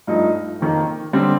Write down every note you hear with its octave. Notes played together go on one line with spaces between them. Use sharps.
G2 F3 A3 D#4
F2 D#3 A#3
D3 G3 C4 G4